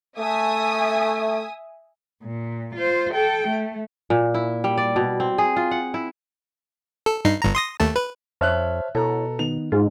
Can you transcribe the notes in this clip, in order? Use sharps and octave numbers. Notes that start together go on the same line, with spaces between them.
A3 E5 G#5 D#6
A#2
F4 C5
A4 G5
A3
A#2
E4
G3
D5
B2
C4
G#4
F4
F#5
E4
A4
G2 D#4 C7
G1 G2 A#5
C6 D#6 A#6
D#2 A3 A5
B4
F2 C5 C#5 E5 A5 F6 F#6
B2 E4 A4 C#5 A#5
D#3 B3 D#4 F7
G#2 F4